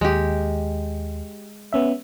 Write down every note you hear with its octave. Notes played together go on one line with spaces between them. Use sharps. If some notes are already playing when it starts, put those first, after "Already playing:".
D#2 G#3 G4
B3 C#4 E5